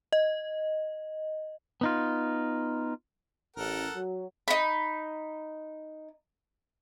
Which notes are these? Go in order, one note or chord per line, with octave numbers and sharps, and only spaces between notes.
D#5
B3 D#4 F4
A1 A4 A#4 F#5
F#3
D#4 B5